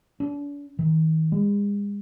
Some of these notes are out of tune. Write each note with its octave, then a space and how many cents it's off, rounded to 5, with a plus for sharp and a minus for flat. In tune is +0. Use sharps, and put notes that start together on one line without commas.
D4 -40
D#3 +40
G#3 -40